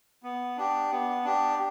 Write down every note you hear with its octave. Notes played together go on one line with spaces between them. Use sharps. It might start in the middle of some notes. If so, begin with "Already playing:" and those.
B3
D4 G4
B3
D4 G4